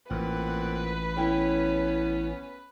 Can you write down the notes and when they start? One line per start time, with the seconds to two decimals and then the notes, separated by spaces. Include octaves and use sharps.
0.11 A1 A#2 C4 B4 F#5
1.17 B3 C#4 E4 A4 G5